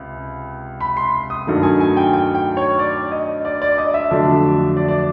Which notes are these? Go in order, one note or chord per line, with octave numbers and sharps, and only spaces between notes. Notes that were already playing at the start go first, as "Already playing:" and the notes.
Already playing: C#2 C3
B5
C6
D#6
G2 D#3 F#3 A3
G#5
G#5
G5
G5
G5
C#5
D5
D#5
D5
D5
D#5
E5
F2 D3 F#3 A3 D4
D5
D5